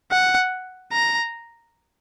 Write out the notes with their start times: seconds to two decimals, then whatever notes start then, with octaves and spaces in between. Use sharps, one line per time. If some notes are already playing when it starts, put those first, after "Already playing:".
0.12 F#5
0.93 A#5